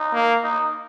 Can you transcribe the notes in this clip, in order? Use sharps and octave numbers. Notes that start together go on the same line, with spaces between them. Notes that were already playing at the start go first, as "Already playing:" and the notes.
Already playing: D#4
A#3
D#4